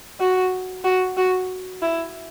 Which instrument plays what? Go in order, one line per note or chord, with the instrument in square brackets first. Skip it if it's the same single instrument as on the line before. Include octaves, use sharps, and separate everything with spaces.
[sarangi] F#4
F#4
F#4
E4